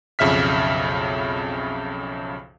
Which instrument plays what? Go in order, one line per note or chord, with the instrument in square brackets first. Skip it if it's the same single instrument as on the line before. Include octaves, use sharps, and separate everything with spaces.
[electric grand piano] B1 F2 C#3 E5 F6 B6